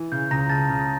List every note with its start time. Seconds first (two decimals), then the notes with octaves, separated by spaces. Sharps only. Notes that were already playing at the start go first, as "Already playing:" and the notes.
Already playing: E3
0.12 C#3 G6
0.31 C#2 A#5 A#6
0.49 C#3 A5 A6
0.69 C#3 A#5